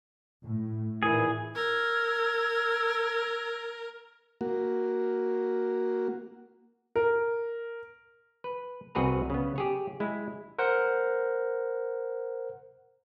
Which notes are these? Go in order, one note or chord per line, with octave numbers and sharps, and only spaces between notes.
A2
A#2 D#3 E3 G#4
A#4 E6 F6 G#6
A#3 F#4
A#4
B4
C2 C4 F#4 G#4 B4 A#5
C#3 B3
G4 G#4 C#5
G#3 E4
A#4 C5 F#5